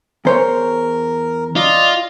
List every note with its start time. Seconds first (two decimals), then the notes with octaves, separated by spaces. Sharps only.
0.25 E2 A#4 C5 C#5
1.56 F4 D5 D#5